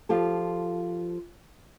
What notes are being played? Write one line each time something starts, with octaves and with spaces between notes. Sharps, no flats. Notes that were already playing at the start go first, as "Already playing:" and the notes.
F3 F4 G4 A4